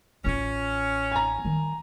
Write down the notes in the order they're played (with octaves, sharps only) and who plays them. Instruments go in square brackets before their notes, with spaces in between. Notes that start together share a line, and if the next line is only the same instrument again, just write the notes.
[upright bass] A1 F4 [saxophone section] C#4
[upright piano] G#5 A#5
[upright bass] D#3 G3